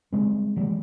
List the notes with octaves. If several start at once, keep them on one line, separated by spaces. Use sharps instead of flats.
G3 G#3 C4
E3 G3 G#3